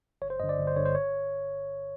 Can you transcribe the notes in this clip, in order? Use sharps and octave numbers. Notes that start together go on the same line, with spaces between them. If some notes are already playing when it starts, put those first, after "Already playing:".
G1 C#5
C5
G2 D3 D#5
D5
G1
C5
G2 D3 C#5
C5
C#5